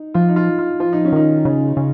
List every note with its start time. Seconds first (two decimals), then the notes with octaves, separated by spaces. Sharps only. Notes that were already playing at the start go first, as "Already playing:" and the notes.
Already playing: D#4
0.14 F3 F4
0.29 D#4
0.36 F4
0.59 F4
0.80 F3 F4
0.93 D#4
1.05 C#4
1.12 D#3 D#4
1.45 C#3
1.77 C#3